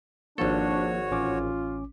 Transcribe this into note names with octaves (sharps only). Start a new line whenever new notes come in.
G#1 F3 A#3 D4 F#4 A4 C#5
A1 C#4 F4 D6